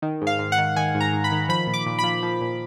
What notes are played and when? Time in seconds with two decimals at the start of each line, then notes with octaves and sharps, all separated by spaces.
0.02 D#3
0.22 G#2
0.27 F5
0.39 G#2
0.52 F#5
0.58 D#3
0.76 D#3 G#5
0.95 G#2
1.00 A#5
1.13 G#2
1.24 B5
1.31 D#3
1.49 F3 B5
1.67 A#2
1.74 D6
1.86 A#2
1.99 F3 B5
2.23 F3
2.41 A#2